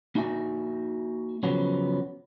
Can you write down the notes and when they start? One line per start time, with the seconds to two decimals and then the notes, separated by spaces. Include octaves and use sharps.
0.15 A#3 D#4 F#4 E5 G#5
1.43 C#3 F3 F#3 B3 C#4